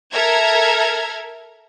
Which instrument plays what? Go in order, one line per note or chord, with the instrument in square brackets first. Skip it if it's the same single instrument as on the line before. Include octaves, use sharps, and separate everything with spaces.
[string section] A4 A#4 E5 A#5 F6 G#6